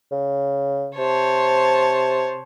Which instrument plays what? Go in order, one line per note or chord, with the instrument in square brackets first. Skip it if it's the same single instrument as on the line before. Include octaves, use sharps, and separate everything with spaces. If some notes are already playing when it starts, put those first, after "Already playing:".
[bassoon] C#3
[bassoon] C3 [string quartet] C5 C#5 A5